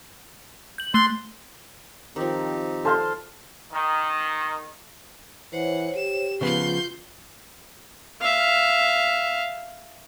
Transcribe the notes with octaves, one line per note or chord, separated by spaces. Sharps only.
G6 F#7
A3 C6 F#6
D#3 F3 C4 D#4 G4
A4 C5 F5 A5 C6
D#3
E3 C5 C#5 F#5
G4 E7
C#3 F3 B3 F4 C6 G6
E5 F5